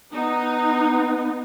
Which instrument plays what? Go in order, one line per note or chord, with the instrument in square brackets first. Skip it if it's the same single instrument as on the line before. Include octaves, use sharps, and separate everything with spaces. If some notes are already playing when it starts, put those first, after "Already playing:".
[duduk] B3 [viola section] D#4